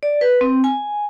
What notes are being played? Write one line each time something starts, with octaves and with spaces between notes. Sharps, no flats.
D5
B4
C4
G#5